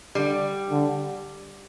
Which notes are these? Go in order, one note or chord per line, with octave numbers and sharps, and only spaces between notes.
D3 G3
D3